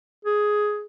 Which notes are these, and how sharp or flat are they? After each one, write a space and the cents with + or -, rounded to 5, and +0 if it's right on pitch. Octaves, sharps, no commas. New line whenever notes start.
G#4 +10